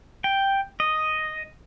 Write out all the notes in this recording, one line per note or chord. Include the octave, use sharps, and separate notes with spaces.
G5
D#5